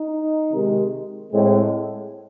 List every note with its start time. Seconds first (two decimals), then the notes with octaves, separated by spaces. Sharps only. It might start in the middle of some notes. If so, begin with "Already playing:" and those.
Already playing: D#4
0.51 C3 D#3 G#3
1.31 A2 G#3 C4